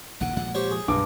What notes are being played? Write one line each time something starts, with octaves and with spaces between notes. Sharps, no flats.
A#1 D#2 C#3 F#5
A#2 F3 G#3 F#5
G4 C5 C#5
G#4
B1 G2 B2 D6